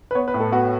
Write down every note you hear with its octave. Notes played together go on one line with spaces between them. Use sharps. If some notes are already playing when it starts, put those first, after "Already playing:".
B4
B3 C#5
B4
A2
A4
B3 F#4